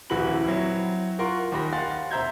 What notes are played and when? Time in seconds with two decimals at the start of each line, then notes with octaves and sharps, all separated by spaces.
0.10 D#1 A#1 E3 F#4 B5 F#7
0.45 F#3 C4 E4
1.19 F4 A#4 F#5 C6 C#6
1.52 D#2 G4 B5 A#6
1.73 F5 F#5 G#5 C6 A6
2.11 E1 C5 E5 A#5 G6 G#6